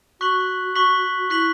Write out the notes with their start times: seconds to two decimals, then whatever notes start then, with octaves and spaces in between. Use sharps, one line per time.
0.21 F#4 C#6 F#6 B6 F#7
0.75 C#6 F#6 B6 F#7
1.30 E4 C#6 F#6 B6 F#7